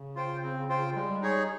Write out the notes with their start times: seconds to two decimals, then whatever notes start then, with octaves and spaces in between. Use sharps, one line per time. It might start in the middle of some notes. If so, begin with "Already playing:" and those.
Already playing: C#3
0.16 F4 C5 G5
0.43 C4
0.69 F4 C5 G5
0.95 G3 G#3
1.22 D#4 G#4 C#5